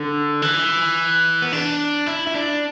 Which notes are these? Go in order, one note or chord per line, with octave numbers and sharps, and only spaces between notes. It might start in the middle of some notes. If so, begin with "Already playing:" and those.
Already playing: D3
E3
B3
D4
E4
E4
D4